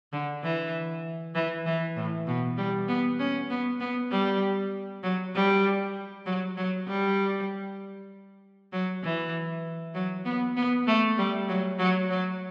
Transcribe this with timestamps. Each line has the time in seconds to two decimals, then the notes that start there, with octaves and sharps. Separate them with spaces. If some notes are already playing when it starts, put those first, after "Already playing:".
0.13 D3
0.43 E3
1.35 E3
1.66 E3
1.96 A2
2.27 B2
2.57 G3
2.88 B3
3.19 C#4
3.50 B3
3.80 B3
4.12 G3
5.03 F#3
5.35 G3
6.26 F#3
6.57 F#3
6.88 G3
8.73 F#3
9.04 E3
9.95 F#3
10.25 B3
10.57 B3
10.88 A3
11.18 G3
11.49 F#3
11.79 F#3
12.10 F#3